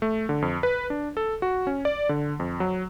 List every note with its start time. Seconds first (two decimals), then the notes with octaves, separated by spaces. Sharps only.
0.02 A3
0.29 D3
0.42 F2
0.63 B4
0.90 D4
1.17 A4
1.42 F#4
1.67 C#4
1.85 D5
2.09 D3
2.40 F2
2.60 F#3